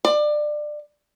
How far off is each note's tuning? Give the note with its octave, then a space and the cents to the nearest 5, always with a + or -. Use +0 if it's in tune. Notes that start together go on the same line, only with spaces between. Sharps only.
D5 +25